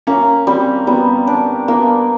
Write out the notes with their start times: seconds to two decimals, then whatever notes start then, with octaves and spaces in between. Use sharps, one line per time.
0.07 A#3 C#4
0.47 G3 C4
0.87 G3 B3
1.27 D4
1.68 A#3 B3